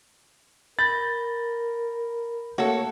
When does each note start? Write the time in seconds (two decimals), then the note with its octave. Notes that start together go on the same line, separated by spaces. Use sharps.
0.79 A#4 B5 G6 A6 A#6
2.58 A3 A#3 F#4 A4 C#5